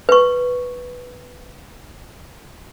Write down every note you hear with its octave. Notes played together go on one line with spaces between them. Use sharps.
B4 C#6